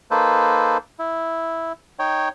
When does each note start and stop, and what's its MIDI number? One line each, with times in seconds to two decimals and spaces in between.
0.11 0.77 58
0.11 0.77 63
0.11 0.77 69
0.11 0.77 71
0.11 0.77 72
0.99 1.72 64
1.99 2.29 63
1.99 2.29 73
1.99 2.29 79